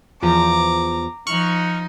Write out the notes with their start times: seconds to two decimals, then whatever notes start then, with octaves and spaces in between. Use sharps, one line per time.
0.22 E2 F3 A#5 D6
1.27 F3 D#4 C#6 F6 F#6